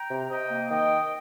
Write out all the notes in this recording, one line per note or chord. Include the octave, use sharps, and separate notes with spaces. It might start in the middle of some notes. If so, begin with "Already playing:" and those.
Already playing: G5 A#5
C3
C3 D#5 G5
A#3
D#3 D#5 G5